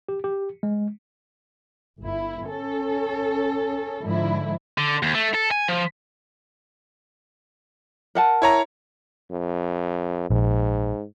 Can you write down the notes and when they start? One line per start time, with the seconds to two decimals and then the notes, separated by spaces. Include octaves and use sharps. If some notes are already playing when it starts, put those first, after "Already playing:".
0.09 G4
0.24 G4
0.63 G#3
2.00 G1 E4
2.47 C#4 A4
4.03 G#2 D3 F3 E4
4.78 D3
5.03 D#2
5.15 A3
5.34 A4
5.51 G#5
5.68 F3
8.15 A#4 F#5 A5
8.42 E4 C#5 A#5
9.31 F2
10.30 A#1 G#2